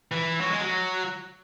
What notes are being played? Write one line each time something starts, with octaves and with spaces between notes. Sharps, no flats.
E3
F#3
G#3
F#3